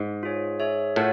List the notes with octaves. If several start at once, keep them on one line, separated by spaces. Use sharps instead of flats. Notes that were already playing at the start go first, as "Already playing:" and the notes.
Already playing: G#2
F4 G#4 C#5
G#4 C#5 E5
A2 F4 A#4 C#5 F#5 A5